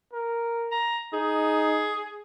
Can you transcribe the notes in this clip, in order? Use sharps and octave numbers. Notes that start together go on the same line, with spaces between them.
A#4
A#5
D#4 G#4